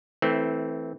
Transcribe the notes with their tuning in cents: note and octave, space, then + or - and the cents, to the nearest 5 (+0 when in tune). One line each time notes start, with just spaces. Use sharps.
E3 -20 A3 +0 C4 +0